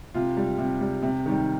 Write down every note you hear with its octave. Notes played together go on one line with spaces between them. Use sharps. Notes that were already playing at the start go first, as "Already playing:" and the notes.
C3 F4
G3
C3
G3
C3
D#3 G3